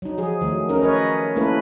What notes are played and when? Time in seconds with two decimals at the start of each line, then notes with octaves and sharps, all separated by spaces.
0.02 F#3 D#4
0.18 F3 G#4
0.41 D#3 F#3 A3
0.69 C#4 D#4 A#4
0.82 B4 C#5 D#5
1.36 A3 A#3 C#4 E4 A4 B4